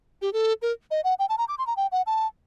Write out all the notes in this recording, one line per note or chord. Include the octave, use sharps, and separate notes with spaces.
G4
A4
A#4
D#5
F#5
G5
A5
A#5
D6
C6
A#5
G5
F#5
A5